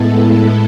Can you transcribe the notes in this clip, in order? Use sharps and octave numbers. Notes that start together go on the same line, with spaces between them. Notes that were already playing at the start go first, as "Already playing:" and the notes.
Already playing: A2 G#3 B3 E4 A4
A4